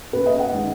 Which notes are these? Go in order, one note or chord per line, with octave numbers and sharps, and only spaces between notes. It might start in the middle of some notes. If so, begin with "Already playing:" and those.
B2 A#3 C#4 B4
D#5
F#5
D#3 G#3 C#4